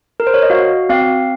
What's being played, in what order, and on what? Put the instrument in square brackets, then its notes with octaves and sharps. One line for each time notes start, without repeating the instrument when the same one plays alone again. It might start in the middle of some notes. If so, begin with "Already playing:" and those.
[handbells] A#4
C5
C#5
D#5
F#4 F5
C4 F5